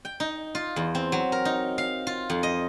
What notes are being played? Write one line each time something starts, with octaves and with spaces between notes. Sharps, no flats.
G5
D#4
F4
E2
C4
F#3
A#4
D#4
F5
F4
F2
D#5